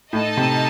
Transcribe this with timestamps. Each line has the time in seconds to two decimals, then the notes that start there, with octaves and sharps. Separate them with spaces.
0.13 A2 D#4 A4 D#5 A5
0.37 C3